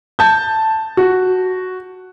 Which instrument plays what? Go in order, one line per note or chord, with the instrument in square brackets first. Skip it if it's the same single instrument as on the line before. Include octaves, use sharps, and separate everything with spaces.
[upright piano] A5 G6
F#4